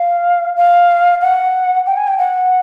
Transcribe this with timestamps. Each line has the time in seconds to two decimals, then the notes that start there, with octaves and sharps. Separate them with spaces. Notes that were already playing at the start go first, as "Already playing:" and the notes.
Already playing: F5
0.56 F5
1.21 F#5
1.86 G5
1.96 G#5
2.07 G5
2.18 F#5